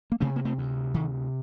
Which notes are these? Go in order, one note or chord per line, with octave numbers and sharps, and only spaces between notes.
A#3
C3 A3 C4
A#3
A3 C4
D2
C3 D#3